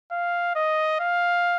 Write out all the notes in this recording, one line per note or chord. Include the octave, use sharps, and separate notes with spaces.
F5
D#5
F5